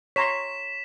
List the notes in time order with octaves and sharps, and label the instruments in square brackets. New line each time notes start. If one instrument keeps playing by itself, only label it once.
[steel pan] C#5 A#5 C6 [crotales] B6 E7